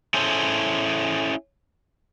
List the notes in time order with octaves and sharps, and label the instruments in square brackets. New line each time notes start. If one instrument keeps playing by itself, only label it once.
[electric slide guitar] C#4 E4 G#4 A4 C5